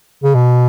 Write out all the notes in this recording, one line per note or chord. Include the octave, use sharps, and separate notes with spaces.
C#3
B2